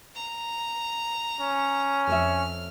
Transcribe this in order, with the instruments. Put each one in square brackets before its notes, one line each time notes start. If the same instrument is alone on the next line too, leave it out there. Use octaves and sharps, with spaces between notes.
[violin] A#5
[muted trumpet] C#4
[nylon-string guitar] F2 C#5 E5 [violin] F6